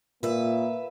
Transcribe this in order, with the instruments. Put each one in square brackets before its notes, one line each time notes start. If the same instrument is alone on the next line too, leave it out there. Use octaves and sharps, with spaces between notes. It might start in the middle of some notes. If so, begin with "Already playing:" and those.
[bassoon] A#2 [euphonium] A#3 [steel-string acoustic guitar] B4 E5